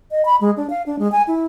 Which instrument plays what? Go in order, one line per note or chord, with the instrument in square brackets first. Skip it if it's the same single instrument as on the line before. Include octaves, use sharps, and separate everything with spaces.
[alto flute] D#5
B5
G#3
D4
F5
D4
G#3
G#5
E4